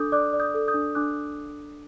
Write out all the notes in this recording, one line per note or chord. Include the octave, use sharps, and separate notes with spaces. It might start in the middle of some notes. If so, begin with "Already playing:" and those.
Already playing: D4 A4 D6 D#6 G6
D5 D6 F#6
D5
D#6 G6
A4
D#6 G6
D4
D4 D6 F#6